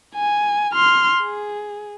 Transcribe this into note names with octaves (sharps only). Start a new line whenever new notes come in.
G#5
C6 F6
G#4